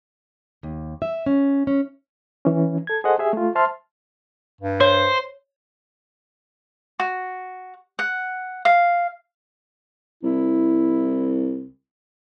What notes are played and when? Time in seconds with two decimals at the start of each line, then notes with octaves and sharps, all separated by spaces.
0.63 D#2
1.02 E5
1.26 C#4
1.67 C#4
2.45 E3 C#4
2.87 A4 G#6
3.04 G#4 A4 C5 D#5 F#5
3.19 G4 G#4 E5
3.33 A3 F4
3.55 C5 E5 A5 C6 F6
4.61 G2
4.81 C5 C#5
7.00 F#4
7.99 F#5
8.65 F5
10.23 C2 E4